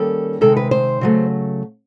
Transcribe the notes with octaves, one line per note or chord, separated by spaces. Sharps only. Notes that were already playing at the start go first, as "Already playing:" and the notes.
Already playing: D#3 G3 A#3 C#4 A4
C3 D#3 G#3 C4 A4
B4
C5
C#3 F#3 A3